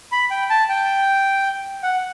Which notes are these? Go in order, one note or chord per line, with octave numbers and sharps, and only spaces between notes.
B5
G5
A5
G5
F#5